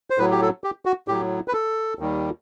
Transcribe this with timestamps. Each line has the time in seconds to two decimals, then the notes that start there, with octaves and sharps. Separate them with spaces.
0.10 C5
0.18 A2 F#3 B4
0.31 G4
0.42 A4
0.64 G4
0.86 F#4
1.08 A2 F#3 G4
1.48 B4
1.53 A4
1.99 D#2 D#3 G3